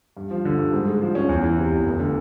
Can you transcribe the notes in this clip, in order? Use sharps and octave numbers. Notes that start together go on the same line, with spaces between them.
G2
F3
D3
G2
G#2
G#3
F3
C#4
E2
E3
C3
E2
F1
D3